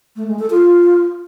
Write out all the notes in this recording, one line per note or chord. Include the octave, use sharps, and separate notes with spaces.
A3
G#3
A4
F4